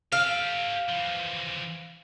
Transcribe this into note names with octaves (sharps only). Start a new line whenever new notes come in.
G4 A4 F5
E3 F3